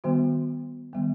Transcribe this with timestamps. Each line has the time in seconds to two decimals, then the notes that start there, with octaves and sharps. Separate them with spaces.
0.04 D#3 G3 B3 F#4
0.93 D#3 G3 B3